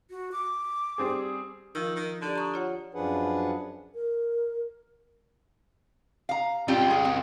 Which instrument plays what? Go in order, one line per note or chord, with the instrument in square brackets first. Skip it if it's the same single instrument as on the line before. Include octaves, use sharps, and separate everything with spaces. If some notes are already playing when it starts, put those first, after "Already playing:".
[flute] F#4
D6
[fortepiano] G3 C4 G#4
[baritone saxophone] D#3 [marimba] F3 F4 E6
[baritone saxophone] D#3
[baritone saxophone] D3 [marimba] G4 D5 A5
[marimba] A#5 C#6 D#6
F4 C#5 F#5
[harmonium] F#2 F3 D4 G#4 B4 F#5
[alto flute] A#4
[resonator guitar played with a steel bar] F5 A#5
[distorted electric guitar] C#2 G5 [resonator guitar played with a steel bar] G3 C4 F4
[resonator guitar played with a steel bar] G#4
C4